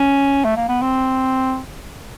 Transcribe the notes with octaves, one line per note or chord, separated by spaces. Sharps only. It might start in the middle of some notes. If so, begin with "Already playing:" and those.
Already playing: C#4
A3
A#3
B3
C4